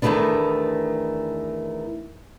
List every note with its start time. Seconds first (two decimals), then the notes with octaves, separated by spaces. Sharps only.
0.02 E2 D#3 F#3 A3 B3 D4